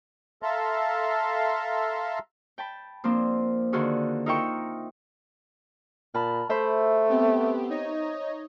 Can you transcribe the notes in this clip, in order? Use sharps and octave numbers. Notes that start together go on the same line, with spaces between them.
A4 E5 F5 A5 A#5 C6
G5 A5 B5
F3 A#3 C4 D4
D3 D#3 F4 F#4 G#4
D#4 F4 A#4 E5 G5 C#6
A#2 A5 B5 F6
A3 C5 E5 B5
B3 C4 G4
D#4 C#5 D#5